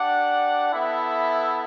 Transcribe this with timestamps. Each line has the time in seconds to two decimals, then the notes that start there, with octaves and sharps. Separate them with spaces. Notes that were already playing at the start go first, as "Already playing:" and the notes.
Already playing: D4 G4 D5 F#5
0.72 B3 E4 A4 E5